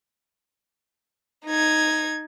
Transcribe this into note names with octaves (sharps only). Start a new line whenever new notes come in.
D#4 G#6